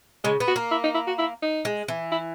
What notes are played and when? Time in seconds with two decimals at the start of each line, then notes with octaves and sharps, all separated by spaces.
0.24 C#3 G#3
0.40 B3
0.47 F#4
0.56 A#3
0.71 E4
0.84 D#4
0.94 E4
1.07 F#4
1.18 E4
1.42 D#4
1.65 G#3
1.88 E3
2.12 E4